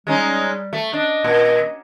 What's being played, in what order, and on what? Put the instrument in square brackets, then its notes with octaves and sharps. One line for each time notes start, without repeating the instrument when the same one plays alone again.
[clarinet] G3 [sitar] G#3 C#4 D#4
[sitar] A3
[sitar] D4 [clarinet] D#5
[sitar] A#2